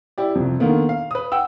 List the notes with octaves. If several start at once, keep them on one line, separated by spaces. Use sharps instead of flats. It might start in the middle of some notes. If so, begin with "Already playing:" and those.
E4 G4 D5
C2 F2
D3 D#3 A#3 B3 A4
F5
B4 D#6
F#5 G5 E6